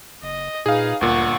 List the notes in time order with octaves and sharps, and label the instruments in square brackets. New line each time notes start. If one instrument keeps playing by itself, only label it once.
[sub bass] F#1 [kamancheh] D#5
[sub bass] A#2 [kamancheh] D#4 B4 [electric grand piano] G#4 F5
[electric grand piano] G1 A#2 [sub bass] D2 [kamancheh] F#5 C#6